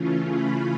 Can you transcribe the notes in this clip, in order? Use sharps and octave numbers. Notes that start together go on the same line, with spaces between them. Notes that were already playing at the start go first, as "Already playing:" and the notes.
Already playing: C#3 E3 A3 C#4 F4
B5